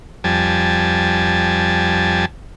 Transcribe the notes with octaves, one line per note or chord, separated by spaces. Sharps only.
F2 G3 G#5 A5